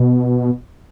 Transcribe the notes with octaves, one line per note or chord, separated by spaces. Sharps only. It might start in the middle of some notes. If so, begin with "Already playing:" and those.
Already playing: B2